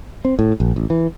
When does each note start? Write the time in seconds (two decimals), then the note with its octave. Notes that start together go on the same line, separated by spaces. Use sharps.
0.25 C4
0.39 A2
0.60 A#1
0.76 A1
0.90 E3